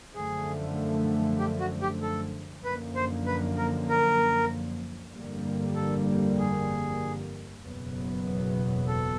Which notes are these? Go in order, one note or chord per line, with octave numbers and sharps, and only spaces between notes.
F#2 D3 F3 A3 G#4
G4
F#4
G4
A4
F#2 D3 F3 A#3 B4
C5
B4
A#4
A#4
G1 F2 D3 G3 A#3
A4
G#4
F#1 E2 B2 F#3 B3
A4